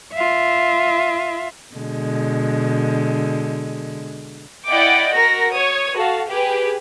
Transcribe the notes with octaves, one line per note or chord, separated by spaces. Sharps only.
F4 E5
B2 D3 G#3
E4 D5 D#5 F#5 G5 D6
F#4 A#4 A#6
C#5 D#6
F#4 A4 F5
G4 G#4 B4